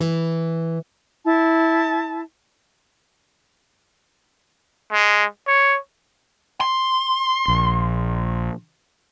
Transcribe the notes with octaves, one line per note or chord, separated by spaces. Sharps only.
E3
E4 A5
G#3
C#5
C6
A#1